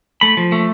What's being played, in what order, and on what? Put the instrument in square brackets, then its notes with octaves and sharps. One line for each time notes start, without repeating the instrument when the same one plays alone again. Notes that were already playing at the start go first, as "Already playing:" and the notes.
[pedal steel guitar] A3 B5
F3
A3